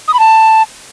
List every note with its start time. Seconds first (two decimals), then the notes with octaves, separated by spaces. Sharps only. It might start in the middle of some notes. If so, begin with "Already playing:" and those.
0.08 D#6
0.14 B5
0.19 A5